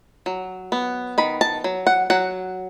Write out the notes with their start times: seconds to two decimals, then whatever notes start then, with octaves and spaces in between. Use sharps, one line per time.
0.26 F#3
0.72 B3
1.18 D#3 B5
1.41 A5
1.64 F#3
1.87 F#5
2.10 F#3 F#5